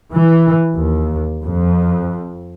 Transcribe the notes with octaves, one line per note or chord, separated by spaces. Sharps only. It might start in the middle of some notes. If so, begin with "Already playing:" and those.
E3
D#2
F2